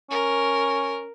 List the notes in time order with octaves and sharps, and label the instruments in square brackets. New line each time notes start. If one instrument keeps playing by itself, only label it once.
[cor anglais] C#4 [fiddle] A#4